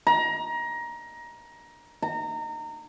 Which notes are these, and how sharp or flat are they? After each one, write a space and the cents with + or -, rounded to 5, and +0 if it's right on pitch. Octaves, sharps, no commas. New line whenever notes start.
A#5 +20
A#5 -25